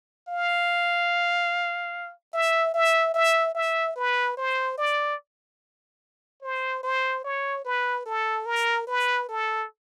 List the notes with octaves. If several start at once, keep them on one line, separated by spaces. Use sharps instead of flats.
F5
E5
E5
E5
E5
B4
C5
D5
C5
C5
C#5
B4
A4
A#4
B4
A4